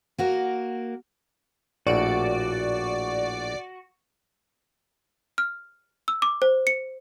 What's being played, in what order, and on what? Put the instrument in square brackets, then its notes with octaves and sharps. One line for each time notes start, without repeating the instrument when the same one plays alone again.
[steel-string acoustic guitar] A#3 F#4 A#4
[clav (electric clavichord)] A#1 A2 [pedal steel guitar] F#4 [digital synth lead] D5
[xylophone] F6
E6
D6
C5
C#7